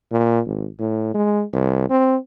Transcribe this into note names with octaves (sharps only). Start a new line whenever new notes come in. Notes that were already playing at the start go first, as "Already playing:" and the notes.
A#2
G#1
A2
G#3
C2
C4